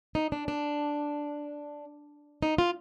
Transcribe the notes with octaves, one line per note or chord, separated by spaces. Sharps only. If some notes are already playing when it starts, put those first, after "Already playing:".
D#4
D4
D4
D#4
F4